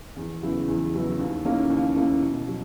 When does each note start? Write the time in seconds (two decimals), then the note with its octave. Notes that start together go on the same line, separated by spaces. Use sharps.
0.16 E2
0.42 C#3 F#3 B3 E4
0.68 E2
0.93 C#3 F#3 B3 E4
1.19 D#2
1.45 D#3 A#3 C#4 E4
1.70 D#2
1.96 D#3 A#3 C#4 E4
2.22 B2
2.48 F#3